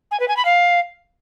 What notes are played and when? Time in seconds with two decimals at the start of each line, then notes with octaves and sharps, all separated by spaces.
0.11 G#5
0.20 B4
0.28 G#5
0.37 B5
0.45 F5